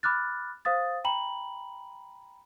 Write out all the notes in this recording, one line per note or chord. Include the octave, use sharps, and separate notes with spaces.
B5 D6 F6 F#6 A6
C5 F5 D#6 A6
G5 A#5 B5 F#7